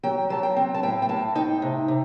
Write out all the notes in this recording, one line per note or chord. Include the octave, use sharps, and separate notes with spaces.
F#3 G5
F#3 A5
G5
C4
A5
A2 G5
G5
A2 A5
D#4 G5
C3
C3